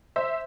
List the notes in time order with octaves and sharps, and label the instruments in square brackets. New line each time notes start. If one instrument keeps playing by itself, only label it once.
[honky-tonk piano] C5 E5